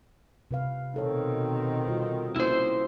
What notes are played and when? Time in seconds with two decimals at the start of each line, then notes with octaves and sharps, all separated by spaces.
0.51 C3 B4 F5
0.94 B2 D#3 C4 D#4 A4 C#5
1.88 G3 F4 F#4
2.36 A#3 C#4 E4 C5